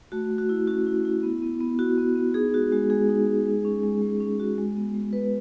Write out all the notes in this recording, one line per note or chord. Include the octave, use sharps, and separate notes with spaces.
A3 F#4
A3
F#4
E4
C#4 F#4
E4
E4
B3
B3
B3
E4 F#4
B3
B3
D#4 G#4
G#3 F#4
G#3 F#4
G#3 G#4
D#4
G#3
G#3
C#4
G#3
G#3
C#4
F#4
G#3
B3
G#3
B3 B4